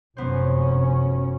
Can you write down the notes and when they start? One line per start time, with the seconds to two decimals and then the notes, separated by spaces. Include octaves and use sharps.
0.17 F1 F#2 B3 C#4 C5